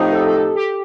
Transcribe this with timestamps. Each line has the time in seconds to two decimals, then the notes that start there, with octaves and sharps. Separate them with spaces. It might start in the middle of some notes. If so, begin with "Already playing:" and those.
Already playing: A2 F3 C4 D#4 G4
0.12 A4
0.27 A4
0.55 G4